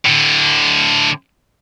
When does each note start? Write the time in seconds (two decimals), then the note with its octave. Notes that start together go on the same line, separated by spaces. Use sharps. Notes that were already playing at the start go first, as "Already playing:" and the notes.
0.06 A2 D3